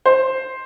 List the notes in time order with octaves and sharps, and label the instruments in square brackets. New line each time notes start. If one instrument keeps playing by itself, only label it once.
[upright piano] C5